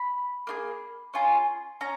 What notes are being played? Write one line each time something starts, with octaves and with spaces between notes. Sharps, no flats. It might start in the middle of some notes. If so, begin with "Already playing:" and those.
Already playing: B5
A#3 F4 G#4
C#4 F4 G#4
C#4 A#5